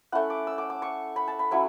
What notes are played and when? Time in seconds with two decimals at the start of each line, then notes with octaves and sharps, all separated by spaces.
0.12 A3 C#4 E4 F#5
0.30 D6
0.47 E6
0.58 D6
0.70 D6
0.82 C#6
1.16 B5
1.28 A5
1.39 B5
1.51 F#3 C#4 E4 C#6